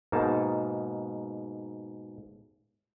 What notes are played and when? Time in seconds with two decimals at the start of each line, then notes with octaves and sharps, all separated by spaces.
0.12 G#2 B2 A#3 D#4 A5